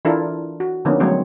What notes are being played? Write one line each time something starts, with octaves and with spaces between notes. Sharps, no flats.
E3 D4 E4 F4 A4 A#4
F#4
D3 F3 A#3 B3 C#4 D#4
F#3 G#3 A3 C4 C#5